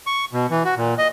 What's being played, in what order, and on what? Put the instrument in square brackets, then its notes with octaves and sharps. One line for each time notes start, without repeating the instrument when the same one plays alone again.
[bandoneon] C#6
B2
E3
F#4
A#2
D#5